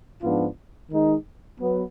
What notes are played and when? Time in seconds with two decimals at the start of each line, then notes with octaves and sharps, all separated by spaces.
0.21 G#2 F3 B3 D4 F4
0.90 D#3 G#3 D#4
1.59 F#3 B3